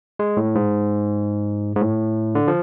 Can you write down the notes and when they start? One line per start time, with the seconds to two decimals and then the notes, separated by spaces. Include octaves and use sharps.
0.19 G#3
0.37 A2
0.55 G#2
1.75 G#2
1.81 A2
2.35 D3
2.48 F3